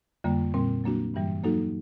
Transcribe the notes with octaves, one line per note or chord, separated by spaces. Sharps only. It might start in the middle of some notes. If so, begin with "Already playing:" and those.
F2 D3 G3 A#3
A#2 G3 C4
F#3 A#3 D4 F#4
G2 E3 G3
F#3 A#3 D#4 F#4 A4